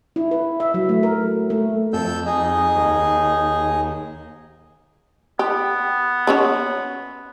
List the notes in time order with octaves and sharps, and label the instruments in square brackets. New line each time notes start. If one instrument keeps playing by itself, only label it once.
[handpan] E4
B4
E5
F#3
A3
A#4
A3
[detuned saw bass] F2 [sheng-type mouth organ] A4 E6 G6
[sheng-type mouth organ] D#4 G#4 D#5
[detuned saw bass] D#2
[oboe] B3 [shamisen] G4
[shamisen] F#3 C#4 C#5